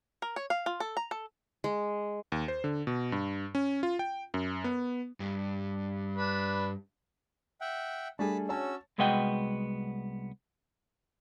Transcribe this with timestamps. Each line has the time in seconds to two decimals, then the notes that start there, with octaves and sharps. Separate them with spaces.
0.22 A#4
0.36 C#5
0.50 F5
0.66 F4
0.80 A4
0.97 A#5
1.11 A4
1.64 G#3
2.32 D#2
2.48 C5
2.64 D3
2.87 B2
3.12 G2
3.55 C#4
3.83 F4
3.99 G5
4.34 F#2
4.64 B3
5.20 G2
6.16 D4 B4
7.61 E5 F#5 G5
8.19 G3 A3 D4 G#4 A5 B5
8.49 C#4 F#4 C#5 A5 E6
8.98 C2 G#3 B3 F#4 D#5 G5